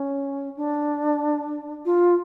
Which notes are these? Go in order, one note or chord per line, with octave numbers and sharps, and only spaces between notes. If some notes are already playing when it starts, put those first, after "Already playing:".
Already playing: C#4
D4
F4